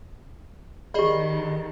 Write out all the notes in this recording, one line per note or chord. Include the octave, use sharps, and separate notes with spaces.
D#3 G4 G#4 D5 D#5 B5